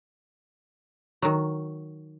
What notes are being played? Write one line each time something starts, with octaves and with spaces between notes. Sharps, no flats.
D#3 F#3